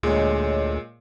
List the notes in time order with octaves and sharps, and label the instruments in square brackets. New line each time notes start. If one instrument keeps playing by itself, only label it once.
[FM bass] D2 [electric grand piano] A#2 [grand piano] G#3 [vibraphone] C#5 D#5